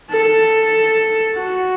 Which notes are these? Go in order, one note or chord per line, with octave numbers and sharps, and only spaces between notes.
A4
F#4